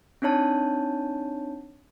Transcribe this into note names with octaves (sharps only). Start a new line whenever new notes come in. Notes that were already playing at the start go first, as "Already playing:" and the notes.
C4 D4 D#4 C#5 A5